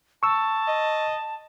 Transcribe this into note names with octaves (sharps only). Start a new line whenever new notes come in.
A5 C#6 E6
D#5